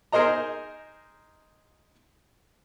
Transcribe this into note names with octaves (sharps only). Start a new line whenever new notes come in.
D#4 G#4 A#4 C5 D#5 A#5